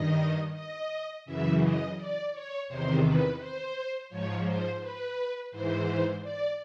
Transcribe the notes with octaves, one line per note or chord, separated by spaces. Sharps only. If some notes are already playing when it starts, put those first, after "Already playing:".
Already playing: G2 D#3 D#5
D#5
F#2 C#3 E3 E5
D#5
D5
C#5
E2 C3 D#3 C5
B4
C5
G#2 F3 C#5
C5
B4
G#2 E3 C5
D5